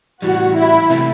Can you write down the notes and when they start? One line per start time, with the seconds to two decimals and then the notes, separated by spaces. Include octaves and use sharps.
0.22 A2 E3 G3 F#4
0.57 E4
0.90 C3 E3 A3